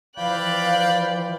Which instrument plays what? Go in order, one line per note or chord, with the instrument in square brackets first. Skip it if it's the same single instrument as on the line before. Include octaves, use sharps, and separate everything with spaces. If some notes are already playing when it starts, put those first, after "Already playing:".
[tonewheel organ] E3 F3 [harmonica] D5 G5 B5 [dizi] F5 [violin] F#6